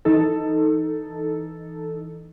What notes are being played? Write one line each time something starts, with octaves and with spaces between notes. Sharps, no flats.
E3 D#4 A4